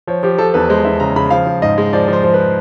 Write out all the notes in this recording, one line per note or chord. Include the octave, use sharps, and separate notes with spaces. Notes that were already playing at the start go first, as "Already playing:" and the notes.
F3 C#5
F3 G4
F3 A4
E2 B4
G#3 C5
E2 E5
C#3 A#5
C#3 B5
F3 F5
F3
G#2 D#5
G#3
F3 D5
F3 C5
F3
B4